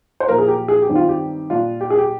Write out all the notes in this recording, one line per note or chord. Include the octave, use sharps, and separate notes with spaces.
C5
A#2 F3 A#3 A#4
G#4
G4
G#4
G4
G2 D#3 G3 C4
F4
G4
A#2 G3 D4 F4
G4
G#4
G4